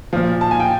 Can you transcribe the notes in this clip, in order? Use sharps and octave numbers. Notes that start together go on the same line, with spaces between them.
A#2 F3
A5
G#5
G5